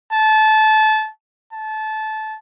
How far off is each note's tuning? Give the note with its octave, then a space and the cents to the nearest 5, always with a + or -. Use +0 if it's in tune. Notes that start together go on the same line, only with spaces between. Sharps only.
A5 -25
A5 -20